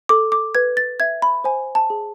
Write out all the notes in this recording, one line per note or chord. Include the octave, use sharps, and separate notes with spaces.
A4 D6
D6
B4 G#6
A6
E5 G#6
B5
C5 G#5
A5
G#4